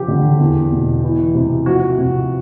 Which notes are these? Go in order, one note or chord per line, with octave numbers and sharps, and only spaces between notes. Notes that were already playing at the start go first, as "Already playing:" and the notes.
Already playing: C#3 F3 G4
D3
E2
B2
E3
C3
F3 F#4
C3